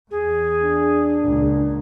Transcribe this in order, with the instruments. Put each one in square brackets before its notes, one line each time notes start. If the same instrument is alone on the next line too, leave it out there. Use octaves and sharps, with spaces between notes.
[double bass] E2 [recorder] G#4
[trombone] D4
[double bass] C#2 A#2